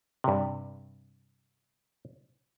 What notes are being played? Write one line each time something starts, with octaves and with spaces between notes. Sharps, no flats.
G2 C3